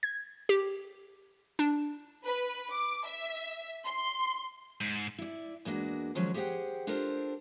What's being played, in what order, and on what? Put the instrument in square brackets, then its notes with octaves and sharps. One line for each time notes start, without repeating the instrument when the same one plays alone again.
[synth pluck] G#6
G4
D4
[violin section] B4
D6
E5
C6
[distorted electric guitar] G#2
[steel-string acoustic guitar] E4 D5
E2 G#3 A#3 D4 F#4
D#3 F3 F#3 G#3 C#4
G4 G#4 C5 D5 F#5 G5
D4 F4 G4 A4 A#4 C5